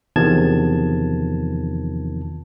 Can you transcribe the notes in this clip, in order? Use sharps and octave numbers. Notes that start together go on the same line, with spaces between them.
E2 C3 D#3 F3 A5 G#6